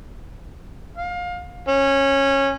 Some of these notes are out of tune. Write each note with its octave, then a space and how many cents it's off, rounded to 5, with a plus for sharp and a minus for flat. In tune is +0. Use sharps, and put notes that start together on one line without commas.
F5 +25
C#4 -15